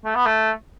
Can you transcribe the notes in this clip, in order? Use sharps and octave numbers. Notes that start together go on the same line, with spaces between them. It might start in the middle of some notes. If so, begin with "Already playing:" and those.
A3
B3
A3